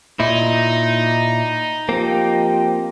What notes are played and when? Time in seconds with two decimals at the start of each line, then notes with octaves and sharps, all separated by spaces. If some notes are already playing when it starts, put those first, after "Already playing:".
0.20 A#2 D#4 E4
1.89 F3 A#3 C4 G4